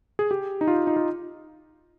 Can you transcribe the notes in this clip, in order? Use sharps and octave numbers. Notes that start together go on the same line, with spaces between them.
G#4
G4
D#4
F4
D#4
F4